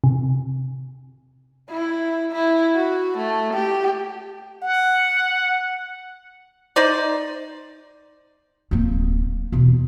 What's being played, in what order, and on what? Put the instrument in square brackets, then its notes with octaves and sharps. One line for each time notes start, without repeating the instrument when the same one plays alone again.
[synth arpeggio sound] C3
[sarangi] E4
E4
F#4
A3
G4
[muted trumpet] F#5
[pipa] D#4 C5 D5
[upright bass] D1 A#3
E2 B2